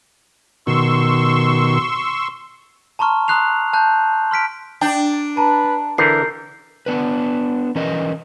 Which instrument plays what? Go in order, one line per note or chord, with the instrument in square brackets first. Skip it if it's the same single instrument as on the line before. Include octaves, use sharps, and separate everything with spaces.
[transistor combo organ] B2 D#3 [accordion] C6 C#6 E6
[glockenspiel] A5 A#5 C6 C#6 F6
A#5 C6 D#6 F#6 C7 F7
A5 F#6 G6
C6 F6 B6 D7
[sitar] D4 [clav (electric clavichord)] G5
[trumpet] B4 [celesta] A5 A#5
[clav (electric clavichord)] D3 E3 [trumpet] A#4 [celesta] G6 C7
[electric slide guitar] B3 D4 B4
E3 C#4 A#4 B4 D#5